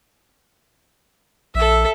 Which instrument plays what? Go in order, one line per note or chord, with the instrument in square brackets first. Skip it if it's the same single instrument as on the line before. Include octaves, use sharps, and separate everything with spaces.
[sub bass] A#1 [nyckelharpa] A4 E5